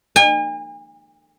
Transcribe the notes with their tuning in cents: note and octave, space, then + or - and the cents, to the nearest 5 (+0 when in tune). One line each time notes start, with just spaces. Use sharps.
G#5 -40